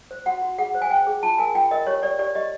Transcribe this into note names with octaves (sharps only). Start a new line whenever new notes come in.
C5
F#4 F#5
F#4
G#4 F#5
C5
G#5
C5 G5
G#4
F4 A5
A#4 G#5
F4 G5
A#4 D#5
G4 C#5
G4 D5
G4 D5
G4 D#5